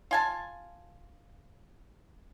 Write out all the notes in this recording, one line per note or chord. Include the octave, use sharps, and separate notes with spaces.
F4 G#5 A5